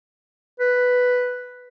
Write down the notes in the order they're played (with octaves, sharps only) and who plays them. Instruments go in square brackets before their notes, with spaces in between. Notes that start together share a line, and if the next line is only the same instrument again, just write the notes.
[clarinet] B4